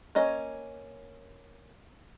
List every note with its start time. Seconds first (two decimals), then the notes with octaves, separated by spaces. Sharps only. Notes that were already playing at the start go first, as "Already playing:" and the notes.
0.15 A#3 C#4 D#5